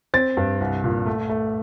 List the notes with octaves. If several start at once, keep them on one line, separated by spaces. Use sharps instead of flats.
C4 A6
G2
C2
A#2
A3
A3